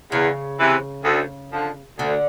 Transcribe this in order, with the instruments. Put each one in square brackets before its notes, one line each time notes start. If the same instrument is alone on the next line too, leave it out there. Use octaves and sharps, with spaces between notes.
[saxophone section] E2 [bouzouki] C#3
[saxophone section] C3 E3
D2
D3 F3
[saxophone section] D2 [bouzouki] D3